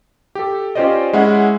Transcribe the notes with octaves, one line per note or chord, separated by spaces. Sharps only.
G4 A4
C#4 F4 G4 C5 D5 D#5
G#3 C#4 E4 F#5